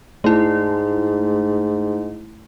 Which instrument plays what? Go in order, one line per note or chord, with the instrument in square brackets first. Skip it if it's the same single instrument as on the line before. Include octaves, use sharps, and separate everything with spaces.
[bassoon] G#2 [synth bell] A3 E4